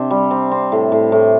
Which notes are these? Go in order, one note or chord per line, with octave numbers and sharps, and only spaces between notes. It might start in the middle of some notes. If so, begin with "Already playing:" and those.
Already playing: C3 C4 D4
G3
C4
C4
A2
A2
A2